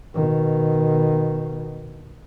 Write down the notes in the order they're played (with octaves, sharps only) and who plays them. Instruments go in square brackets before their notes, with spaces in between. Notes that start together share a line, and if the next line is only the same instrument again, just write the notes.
[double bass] B2 D#3